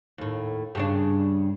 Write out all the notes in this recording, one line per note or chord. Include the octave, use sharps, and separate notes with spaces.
D#2 A2
G2 C#3 D4